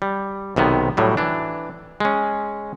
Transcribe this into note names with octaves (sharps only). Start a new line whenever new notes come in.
G3
B1 C3 D#3 B3
A2 F#3 G3
E3 D4
G#3 C#4